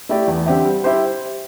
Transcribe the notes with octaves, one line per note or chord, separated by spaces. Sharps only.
A3 E4 G4 D5
E2
D3 C4 G4 E5
G3
E4 G4 C5